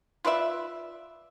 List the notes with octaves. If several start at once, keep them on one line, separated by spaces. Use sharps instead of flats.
F4 B4 D5 E5